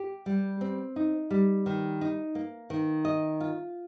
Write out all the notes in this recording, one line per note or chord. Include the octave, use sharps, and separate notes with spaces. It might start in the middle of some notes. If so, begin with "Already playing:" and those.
Already playing: G4
G3
C4
D#4
G3
D#3
D#4
A#3
D#3
D#5
F4